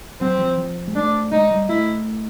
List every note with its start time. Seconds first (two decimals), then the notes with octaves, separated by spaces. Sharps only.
0.21 F#3 C4
0.39 F3
0.58 F3
0.88 G#3
0.95 A3 D4
1.32 G#3 D#4
1.51 G3
1.69 A3 E4